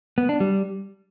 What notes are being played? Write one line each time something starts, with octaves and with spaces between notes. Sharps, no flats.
B3
D4
G3